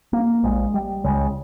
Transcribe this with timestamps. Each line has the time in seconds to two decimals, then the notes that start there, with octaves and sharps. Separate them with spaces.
0.13 A#3
0.43 A#1 A#2 G#3
0.74 G3
1.04 C#2 C#3 G#3